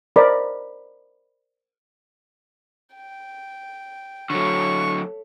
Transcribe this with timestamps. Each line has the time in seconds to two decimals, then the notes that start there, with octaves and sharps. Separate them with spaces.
0.16 A#4 C5 D5 D#5 B5
2.95 G5
4.30 D3 F#3 A3 C#5 C#6